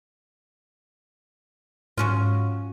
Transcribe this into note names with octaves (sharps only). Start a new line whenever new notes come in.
G#2 F#3 C#4 F4